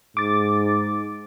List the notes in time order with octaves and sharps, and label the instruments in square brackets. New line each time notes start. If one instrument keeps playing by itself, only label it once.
[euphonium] G#2 [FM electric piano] D6 A6